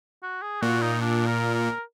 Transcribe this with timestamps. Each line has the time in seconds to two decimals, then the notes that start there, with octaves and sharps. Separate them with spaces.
0.23 F#4
0.42 G#4
0.61 A#2 F#4
0.82 D#4
1.01 D4
1.27 A#4
1.54 A#4